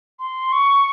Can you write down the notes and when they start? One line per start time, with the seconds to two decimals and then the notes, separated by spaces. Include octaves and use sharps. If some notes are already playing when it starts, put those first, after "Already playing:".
0.19 C6
0.52 C#6